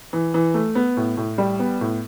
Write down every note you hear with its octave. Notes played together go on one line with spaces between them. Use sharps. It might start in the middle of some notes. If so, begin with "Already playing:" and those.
E3
E3
A3
B3
A2
A2
G3
B3
A2